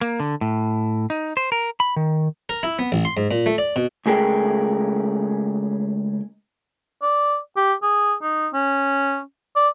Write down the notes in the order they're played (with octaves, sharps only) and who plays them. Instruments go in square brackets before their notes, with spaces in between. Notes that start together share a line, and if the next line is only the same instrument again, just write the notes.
[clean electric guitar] A#3
D3
A2
D#4
C5
A#4
B5
D#3
[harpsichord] A#4
E4
B3
A1
C6
G#2
A#2
A3
D5
B2
[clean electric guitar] C#2 A3 G#4 A#4 G5
[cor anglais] D5
G4
G#4
D#4
C#4
D5